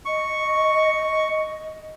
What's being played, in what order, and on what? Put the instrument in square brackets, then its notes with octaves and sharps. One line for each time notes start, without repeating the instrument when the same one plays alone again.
[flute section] D#5 [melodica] C#6